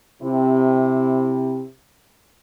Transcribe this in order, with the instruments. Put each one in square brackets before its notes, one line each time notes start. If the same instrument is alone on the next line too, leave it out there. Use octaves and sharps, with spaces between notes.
[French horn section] C3 E4